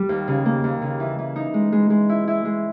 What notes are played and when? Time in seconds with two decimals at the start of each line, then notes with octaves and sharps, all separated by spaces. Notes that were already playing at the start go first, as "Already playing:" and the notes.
Already playing: G3
0.09 D#2
0.28 C#3
0.45 A#3
0.64 D#2
0.82 C#3
1.00 E3
1.19 E3
1.36 D#4
1.54 G#3
1.72 G#3
1.90 G#3
2.09 E4
2.28 E4
2.45 G#3